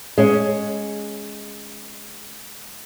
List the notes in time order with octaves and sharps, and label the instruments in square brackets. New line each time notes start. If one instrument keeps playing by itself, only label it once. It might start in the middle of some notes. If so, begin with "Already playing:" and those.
[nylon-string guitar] G#3 C#4